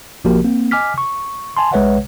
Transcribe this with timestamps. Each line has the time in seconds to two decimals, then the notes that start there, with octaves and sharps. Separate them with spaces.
0.24 A#1 F3 A#3 F#4 G4 A#4
0.44 A#3 C4
0.71 D#5 G#5 D6 F6 B6
0.98 C#6
1.57 G#5 A5 C6
1.72 B1 G#3 B4 C#5 E5 F#5